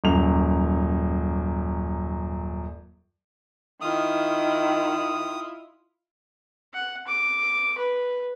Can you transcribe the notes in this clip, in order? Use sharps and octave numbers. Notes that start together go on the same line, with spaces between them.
D#1 F#2 F7
D#3 E4 F4 D#6
F#5
D6
B4